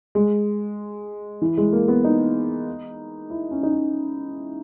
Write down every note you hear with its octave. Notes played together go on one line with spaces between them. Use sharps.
G#3
E3
G#3
A#3
B3
D#4
E4
C#4
D#4
C#4